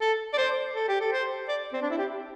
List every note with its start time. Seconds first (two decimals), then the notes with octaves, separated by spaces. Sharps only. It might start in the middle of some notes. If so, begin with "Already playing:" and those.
0.01 A4
0.33 D5
0.38 C5
0.75 A4
0.88 G4
1.00 A4
1.12 C5
1.49 D5
1.73 C4
1.82 D4
1.90 E4
1.98 G4